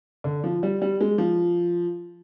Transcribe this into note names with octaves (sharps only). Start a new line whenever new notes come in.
D3
F3
G3
G3
G#3
F3